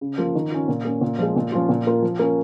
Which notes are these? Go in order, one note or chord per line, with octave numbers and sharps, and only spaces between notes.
C#3
F3 A#3 F4
D#3
C#4 F4
A#2
A#3 C#4
A#2
F3 G#3
A#2
F3 C#4 F4
A#2
A#3 F4
F3
A#3 C#4